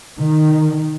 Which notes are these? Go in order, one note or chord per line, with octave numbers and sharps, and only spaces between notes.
D#3